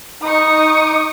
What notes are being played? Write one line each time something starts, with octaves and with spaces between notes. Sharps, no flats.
D#4 C#6 D#6